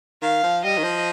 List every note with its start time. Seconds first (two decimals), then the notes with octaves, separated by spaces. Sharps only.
0.22 D#3 F5
0.44 F3
0.64 G3 D#5
0.78 D#3
0.84 F3